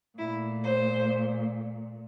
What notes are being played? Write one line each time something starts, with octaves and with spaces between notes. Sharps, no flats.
A#2 A3 E4
C5